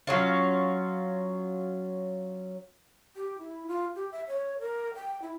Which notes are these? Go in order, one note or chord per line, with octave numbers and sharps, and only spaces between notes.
F#3 C#4 F4
G4
E4
F4
G4
E5
C#5
A#4
G5
E4